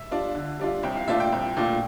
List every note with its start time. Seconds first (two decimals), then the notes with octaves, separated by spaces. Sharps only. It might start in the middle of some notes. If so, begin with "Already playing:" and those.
Already playing: E5
0.11 G3 D4 F4
0.35 D3
0.60 G3 D4 F4
0.83 C2 G5
0.96 F5
1.07 A#2 A3 D4 F4 E5
1.20 G5
1.32 C2
1.57 A#2 A3 D4 F4